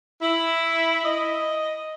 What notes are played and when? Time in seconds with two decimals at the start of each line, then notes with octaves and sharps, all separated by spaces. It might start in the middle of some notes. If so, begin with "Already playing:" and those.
0.22 E4
1.05 D#5